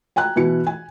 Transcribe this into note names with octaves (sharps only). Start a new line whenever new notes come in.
G5 G#5 A#5 F#6
B2 E3 E4 C#7
G#5